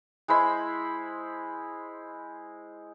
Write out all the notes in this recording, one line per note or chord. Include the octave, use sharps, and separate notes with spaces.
G#3 E4 C5 B5